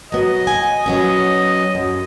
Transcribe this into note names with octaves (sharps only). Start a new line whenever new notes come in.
F#3 B3 D#5
G#5
F#3 B3 C#4 D#5
F#2